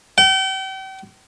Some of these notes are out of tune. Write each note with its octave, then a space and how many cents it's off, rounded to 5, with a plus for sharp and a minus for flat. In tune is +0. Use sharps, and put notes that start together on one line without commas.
G5 -40